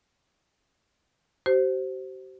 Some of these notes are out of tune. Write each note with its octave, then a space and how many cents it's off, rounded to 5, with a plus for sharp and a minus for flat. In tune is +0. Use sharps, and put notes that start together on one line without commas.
G4 -45 C5 +0